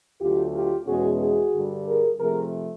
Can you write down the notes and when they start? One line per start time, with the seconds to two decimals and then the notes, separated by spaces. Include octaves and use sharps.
0.21 D2 D3 F#3 F4 G4
0.54 F4 G4
0.87 E2 B2 G#3 C#4 F#4 G#4
1.20 F#4 G#4
1.54 G2 D3 G3
1.86 G#4 A#4
2.20 C3 F3 A3 G#4 A#4